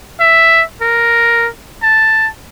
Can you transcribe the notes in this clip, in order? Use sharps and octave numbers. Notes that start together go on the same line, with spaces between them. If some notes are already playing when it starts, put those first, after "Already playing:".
E5
A#4
A5